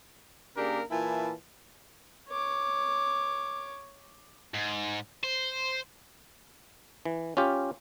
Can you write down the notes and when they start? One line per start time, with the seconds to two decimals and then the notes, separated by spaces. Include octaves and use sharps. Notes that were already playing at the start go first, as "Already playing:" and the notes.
0.57 C#3 A#3 D4 G4 G#4 A#4
0.91 A#2 E3 E4 F4 G#5 A5
2.29 C#5 D6
4.54 G#2
5.23 C5
7.05 E3
7.37 C#4 F4 G4